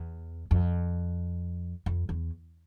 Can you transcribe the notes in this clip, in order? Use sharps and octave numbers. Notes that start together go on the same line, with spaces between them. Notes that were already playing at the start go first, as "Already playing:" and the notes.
Already playing: E2
F2
F2
E2